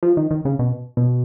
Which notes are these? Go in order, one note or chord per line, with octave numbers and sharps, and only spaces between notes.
F3
D#3
D#3
C#3
B2
B2